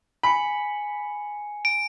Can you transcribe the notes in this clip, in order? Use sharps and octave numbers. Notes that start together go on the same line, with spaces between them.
G#5 B5 C#7
D7